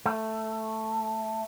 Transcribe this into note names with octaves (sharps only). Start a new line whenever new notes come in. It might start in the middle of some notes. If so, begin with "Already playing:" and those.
A3